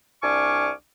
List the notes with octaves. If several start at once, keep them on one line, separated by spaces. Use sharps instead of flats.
C2 D4 G#5 C#6 D6 F6